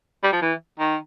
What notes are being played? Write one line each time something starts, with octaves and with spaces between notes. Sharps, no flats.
G3
F3
E3
D#3